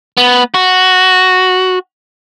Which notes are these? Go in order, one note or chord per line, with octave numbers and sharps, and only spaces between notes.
B3
F#4